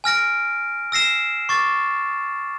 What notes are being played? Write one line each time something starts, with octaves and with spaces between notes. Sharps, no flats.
G#5 F6 A#6 D7
E6 A#6 C7 E7
C#6 D6 A6